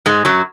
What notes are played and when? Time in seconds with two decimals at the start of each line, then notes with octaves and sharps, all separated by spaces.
0.06 G#2 G#3
0.25 F#2 F#3